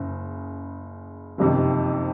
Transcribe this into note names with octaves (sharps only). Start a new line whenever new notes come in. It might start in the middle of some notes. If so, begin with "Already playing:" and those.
Already playing: F#1 C#3
F#1 F2 C3 D#3